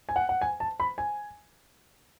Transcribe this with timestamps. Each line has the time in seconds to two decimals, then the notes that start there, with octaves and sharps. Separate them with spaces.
0.09 G#5
0.16 F#5
0.29 F#5
0.41 G#5
0.60 A5
0.80 B5
0.98 G#5